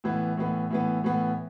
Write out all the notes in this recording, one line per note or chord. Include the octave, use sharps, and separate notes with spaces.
A2 E3 B3
A2 E3 B3
A2 E3 B3
A2 E3 B3